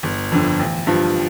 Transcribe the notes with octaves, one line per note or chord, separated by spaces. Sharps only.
G1
F2 D3
A1
G2 F3